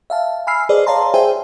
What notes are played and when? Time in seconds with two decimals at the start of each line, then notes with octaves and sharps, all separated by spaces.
0.10 E5 F5 A5
0.47 G#5 B5 E6 F6 C7
0.69 G#4 B4 C5 D5 D#5
0.86 C#5 D5 F5 A5 A#5 C6
1.14 G#4 C5 E5 G5 G#5